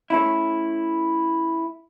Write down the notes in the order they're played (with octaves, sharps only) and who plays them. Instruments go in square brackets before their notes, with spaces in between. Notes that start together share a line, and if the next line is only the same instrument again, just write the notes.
[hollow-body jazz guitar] A3 C#4 E4